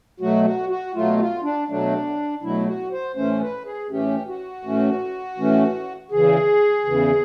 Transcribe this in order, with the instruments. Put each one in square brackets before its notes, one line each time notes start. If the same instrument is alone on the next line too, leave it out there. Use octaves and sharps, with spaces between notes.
[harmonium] B2 F#3 A3 F#4
F#4
F#4
B2 F#3 A3 F4
F4
D4
B2 F#3 A3 D4
B2 F#3 A3 E4
F#4
C5
A2 E3 A3 C#4 C5
B4
G#4
A2 E3 A3 C#4 G4
F#4
A2 E3 A3 C#4
A2 E3 A3 C#4
E2 C#3 E3 G#4
E2 C#3 E3